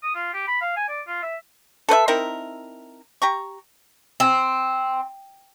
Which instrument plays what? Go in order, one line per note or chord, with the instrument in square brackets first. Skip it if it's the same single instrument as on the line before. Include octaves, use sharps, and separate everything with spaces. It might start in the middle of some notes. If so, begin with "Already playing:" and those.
[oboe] D#6
F4
G4
B5
F5
G#5
D5
F4
E5
[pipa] A4 B4 C5 E5
C4 D#4 E4 A#4
G4 A#5 C#6
[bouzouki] C4